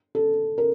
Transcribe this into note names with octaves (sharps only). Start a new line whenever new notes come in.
A4
A#4